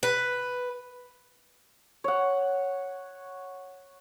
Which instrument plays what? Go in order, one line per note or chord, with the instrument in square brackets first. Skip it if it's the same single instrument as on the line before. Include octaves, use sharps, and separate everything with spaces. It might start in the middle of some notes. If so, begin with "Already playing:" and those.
[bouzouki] B4
[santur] C#5 F#5